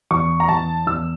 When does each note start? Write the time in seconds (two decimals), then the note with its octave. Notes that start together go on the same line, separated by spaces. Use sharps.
0.11 E2 C#6
0.40 A#5
0.48 E2 A5
0.87 E2 E6